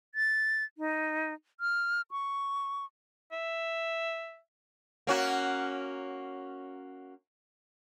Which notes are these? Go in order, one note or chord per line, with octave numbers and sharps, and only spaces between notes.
A6
D#4
F6
C#6
E5
A#3 C#4 F#4